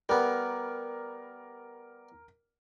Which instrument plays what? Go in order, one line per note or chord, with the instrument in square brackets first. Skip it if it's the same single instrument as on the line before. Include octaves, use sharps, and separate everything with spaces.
[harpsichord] G3 B3 [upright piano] A#4